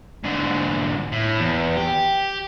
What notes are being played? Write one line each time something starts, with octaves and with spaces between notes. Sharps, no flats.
G#2 D3
A2
E2
G4